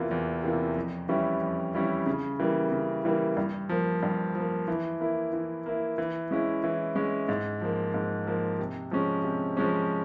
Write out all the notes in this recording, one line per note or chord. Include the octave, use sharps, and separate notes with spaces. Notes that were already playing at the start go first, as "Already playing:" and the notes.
Already playing: E2 C3 E3 A#3 F4
E2
C3 E3 A#3 F4
F2
E3 G3 C#4 E4
F2
E3 G3 C#4 E4
C#3
E3 G3 A#3
C#3
E3 G3 A#3
G2
F3 A#3
G2
F3 A#3
E3
A#3 E4
E3
A#3 E4
E3
G#3 C#4 E4
E3
G#3 C#4 E4
G#2
F3 A#3
G#2
F3 A#3
C3
F3 G#3 C#4
C3
F3 G#3 C#4